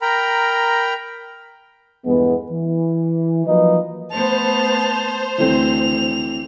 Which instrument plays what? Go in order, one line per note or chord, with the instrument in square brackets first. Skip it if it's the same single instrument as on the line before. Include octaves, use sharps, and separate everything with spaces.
[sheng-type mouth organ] A#4 G5 A#5 B5
[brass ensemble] E2 G2 G#3 A3 B3
E3
F3 F#3 A#3 D#4 B4 D#5
[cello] A3 B3 [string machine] C5 [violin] A5 F7
[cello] D2 [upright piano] E3 A3 C4 [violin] F7